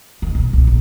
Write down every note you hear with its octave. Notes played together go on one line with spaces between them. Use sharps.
D#3
B1
B1
A#1